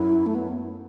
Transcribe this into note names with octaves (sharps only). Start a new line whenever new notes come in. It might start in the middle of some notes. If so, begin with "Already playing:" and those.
Already playing: F#2 E4
A3
B3